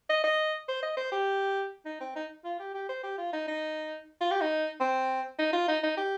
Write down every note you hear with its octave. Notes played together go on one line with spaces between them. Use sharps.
D#5
D#5
C5
D#5
C5
G4
D#4
C4
D#4
F4
G4
G4
C5
G4
F4
D#4
D#4
F4
G4
D#4
C4
D#4
F4
D#4
D#4
G4